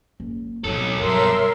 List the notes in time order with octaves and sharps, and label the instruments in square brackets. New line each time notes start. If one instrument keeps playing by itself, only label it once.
[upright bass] F#1
[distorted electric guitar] B1 A4 [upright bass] E2 C4 [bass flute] C#5
[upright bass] G2 [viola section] A#4 E5 C6